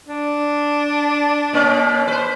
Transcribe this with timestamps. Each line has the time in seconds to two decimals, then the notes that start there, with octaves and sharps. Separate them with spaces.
0.08 D4
1.53 B2 A#3 C#4
2.07 B4 C5